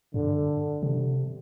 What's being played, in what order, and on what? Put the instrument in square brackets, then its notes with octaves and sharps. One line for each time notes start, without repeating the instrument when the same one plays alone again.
[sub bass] G2 [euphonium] D3
[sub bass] C3